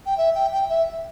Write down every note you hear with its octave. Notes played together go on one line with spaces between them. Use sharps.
G5
E5
G5
G5
E5